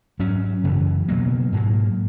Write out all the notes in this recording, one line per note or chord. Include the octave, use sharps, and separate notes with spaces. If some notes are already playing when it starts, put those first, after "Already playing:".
G#2 F#3 C#4
F#2 C#3 E3
B2 F#3 A#3
G#2 F#3 A#3